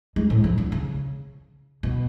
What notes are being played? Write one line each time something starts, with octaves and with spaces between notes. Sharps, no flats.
G#3
A2
F3
D3
C#3
B2